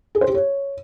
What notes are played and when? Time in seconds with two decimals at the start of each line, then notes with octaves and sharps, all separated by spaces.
0.15 G#4
0.21 C5
0.28 G4
0.34 C#5